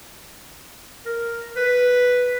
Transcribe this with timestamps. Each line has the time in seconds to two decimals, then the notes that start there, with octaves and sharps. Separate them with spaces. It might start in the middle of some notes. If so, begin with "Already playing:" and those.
1.06 A#4
1.56 B4